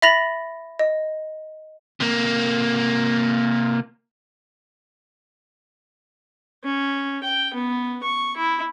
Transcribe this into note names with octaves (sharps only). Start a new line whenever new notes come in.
E5 B5 A6 A#6 F7 F#7
D#5
C3 A#3
C#4
G5
B3
C#6
E4